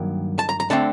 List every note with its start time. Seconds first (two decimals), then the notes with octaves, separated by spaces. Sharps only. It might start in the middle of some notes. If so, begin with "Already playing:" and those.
Already playing: G2 D#3 F#3 A#3
0.39 A5
0.49 A#5
0.60 A#5
0.70 D3 A3 C4 A5